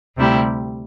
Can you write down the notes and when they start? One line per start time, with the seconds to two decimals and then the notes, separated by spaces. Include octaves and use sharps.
0.17 D2 C3 G3 E4 G4